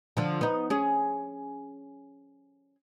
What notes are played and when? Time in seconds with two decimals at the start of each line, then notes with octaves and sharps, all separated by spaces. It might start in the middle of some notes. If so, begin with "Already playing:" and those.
0.17 D3 F3
0.41 B3 D#4
0.70 C#4 G#4